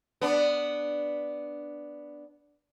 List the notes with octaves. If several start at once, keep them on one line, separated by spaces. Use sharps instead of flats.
B3 D4